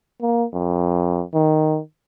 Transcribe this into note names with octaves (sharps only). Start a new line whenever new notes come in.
A#3
F2
D#3